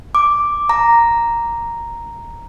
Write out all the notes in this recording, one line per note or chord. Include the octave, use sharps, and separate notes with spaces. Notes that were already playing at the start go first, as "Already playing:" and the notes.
D6
A#5